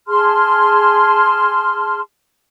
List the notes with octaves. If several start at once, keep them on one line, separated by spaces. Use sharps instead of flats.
G#4 A5 C6 F6